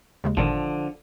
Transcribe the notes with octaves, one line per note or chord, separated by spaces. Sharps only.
D#2 C#3 G#3
G#1 A#2 D3 D#3 F3